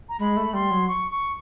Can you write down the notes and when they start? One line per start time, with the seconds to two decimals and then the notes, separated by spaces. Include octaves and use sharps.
0.09 A#5
0.19 G#3 B5
0.37 A3
0.54 G3 C6
0.71 F#3
0.88 C#6
1.11 C#6